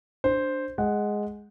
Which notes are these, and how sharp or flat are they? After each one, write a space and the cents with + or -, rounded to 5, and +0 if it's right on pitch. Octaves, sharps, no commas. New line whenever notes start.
D4 +0 C5 +0
G#3 +0 F#5 +0